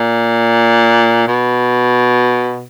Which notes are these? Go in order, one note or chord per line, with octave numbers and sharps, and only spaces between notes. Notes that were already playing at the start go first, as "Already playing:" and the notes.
Already playing: A#2
B2